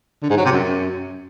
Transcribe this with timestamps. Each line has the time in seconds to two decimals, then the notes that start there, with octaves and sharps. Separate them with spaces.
0.22 D3
0.30 G#2
0.37 F#3
0.45 C3
0.52 F#2